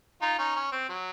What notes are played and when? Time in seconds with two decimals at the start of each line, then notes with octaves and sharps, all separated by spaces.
0.22 D#4 F4
0.39 C#4 D#4
0.56 C#4
0.72 C4
0.89 F#3